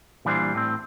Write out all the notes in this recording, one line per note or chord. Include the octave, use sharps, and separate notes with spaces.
A#2 E3 G3 D4 C5
A2 C4